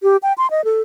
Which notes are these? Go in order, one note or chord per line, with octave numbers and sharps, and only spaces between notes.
G4
G5
C6
D#5
A4